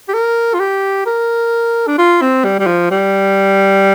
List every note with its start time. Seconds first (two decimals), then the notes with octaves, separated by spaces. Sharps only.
0.08 G4
0.14 A#4
0.54 F4
0.60 G4
1.06 A#4
1.87 D4
1.98 F4
2.21 C4
2.44 G3
2.59 G3
2.67 F3
2.91 G3